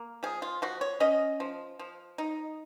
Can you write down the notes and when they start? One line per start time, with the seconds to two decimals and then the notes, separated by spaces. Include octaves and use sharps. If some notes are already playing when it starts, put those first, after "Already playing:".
Already playing: A#3
0.23 F3 G#4
0.42 F4
0.62 F3 F#4
0.81 C#5
1.00 C#4 D#5
1.40 F3
1.79 F3
2.18 D#4